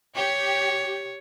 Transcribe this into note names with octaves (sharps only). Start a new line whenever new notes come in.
G4 C#5